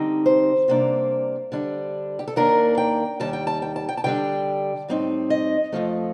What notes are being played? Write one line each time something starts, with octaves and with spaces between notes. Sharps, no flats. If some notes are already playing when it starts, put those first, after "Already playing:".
Already playing: D3 G3 C4 D#4
C5
C3 G3 A#3 D4
D3 G3 D4
G4
A4
D#2 D#3 A#3 D4 A#4
G5
D#2 D#3 G3 A5
G5
A5
G5
A5
G5
A5
D3 G3 D4 G5
A2 G3 C4 D#4
D#5
F2 D3 F3 A3